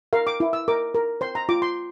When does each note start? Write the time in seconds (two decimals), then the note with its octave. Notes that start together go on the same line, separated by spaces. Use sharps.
0.13 A#4 F5
0.27 D6
0.40 E4
0.53 E6
0.68 A#4 D6
0.95 A#4
1.21 C5 C6
1.35 A#5
1.49 F4 D6
1.62 C6